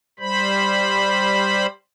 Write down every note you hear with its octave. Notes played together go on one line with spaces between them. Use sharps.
G3 C5 B5